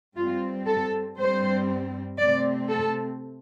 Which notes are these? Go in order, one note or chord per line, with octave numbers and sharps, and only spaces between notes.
G2 G3 C4 F4
A4
G2 G3 C4 C5
C3 A3 C4 D5
A4